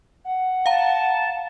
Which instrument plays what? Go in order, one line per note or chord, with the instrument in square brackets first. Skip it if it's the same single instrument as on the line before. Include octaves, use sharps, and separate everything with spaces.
[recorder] F#5
[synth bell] F5 A#5 [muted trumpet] A5